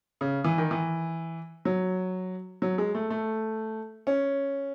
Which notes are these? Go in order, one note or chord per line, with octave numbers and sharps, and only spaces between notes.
C#3
E3
D#3
E3
F#3
F#3
G#3
A3
A3
C#4